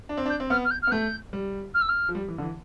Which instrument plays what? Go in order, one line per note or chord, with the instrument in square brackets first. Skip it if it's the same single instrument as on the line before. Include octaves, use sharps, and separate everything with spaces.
[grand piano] D4
C4
D4
[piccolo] G6
[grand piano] C4
[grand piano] B3 [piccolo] F6
[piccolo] F6
G6
F6
[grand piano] B3
[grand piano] A3 [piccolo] G6
[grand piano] G3
[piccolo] F6
E6
F6
[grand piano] F3
G3
E3
D3
E3